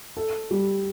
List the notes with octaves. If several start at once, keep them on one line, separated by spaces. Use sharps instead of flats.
A4
G3